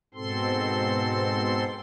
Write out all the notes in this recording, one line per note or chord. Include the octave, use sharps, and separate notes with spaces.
G#2 B2 C4 A4 C6